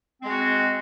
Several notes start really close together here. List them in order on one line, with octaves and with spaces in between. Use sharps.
C4 G#3 F#4